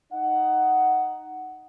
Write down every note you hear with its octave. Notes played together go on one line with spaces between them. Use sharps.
D#4 F#5